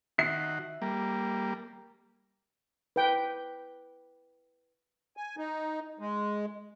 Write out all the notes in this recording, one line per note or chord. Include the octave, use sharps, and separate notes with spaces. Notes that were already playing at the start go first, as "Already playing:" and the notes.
D#3 F#4 E5 C7
G3 A#3
B4 G5
G#5
D#4
G#3